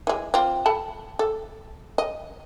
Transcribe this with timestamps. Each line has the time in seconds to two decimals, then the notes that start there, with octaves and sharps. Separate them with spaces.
0.07 E3 G#3
0.34 C4 F4
0.66 A4 A5 B5
1.19 A4
1.98 D#5